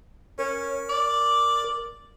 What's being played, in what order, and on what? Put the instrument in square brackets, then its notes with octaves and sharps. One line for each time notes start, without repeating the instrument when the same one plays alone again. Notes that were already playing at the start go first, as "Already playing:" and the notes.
[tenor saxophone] C#4 [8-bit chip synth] A#4
[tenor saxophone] D5